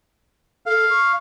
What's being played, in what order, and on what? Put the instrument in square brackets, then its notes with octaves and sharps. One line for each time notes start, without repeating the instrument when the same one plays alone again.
[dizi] A4 [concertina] F5
[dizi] C#6